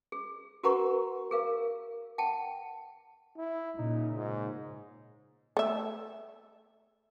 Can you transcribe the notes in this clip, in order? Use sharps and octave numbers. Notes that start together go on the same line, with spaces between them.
G#4
F#4 A#4 B4 F#5 A#5 C#6
G#4 A#4 F5
F#5 G5 A5
E4
A#2 C#3 D#4
G#2
A3 E5